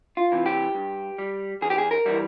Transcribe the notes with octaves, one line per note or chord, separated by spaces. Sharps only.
F4
C3 E3
G4
G2
G3
E2 G#4
G4
G#4
A#4
E3 G3